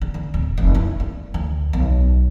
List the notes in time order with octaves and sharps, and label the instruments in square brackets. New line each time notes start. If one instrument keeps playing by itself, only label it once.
[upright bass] D3
D3
D1
F1
E4
G3
D2
B1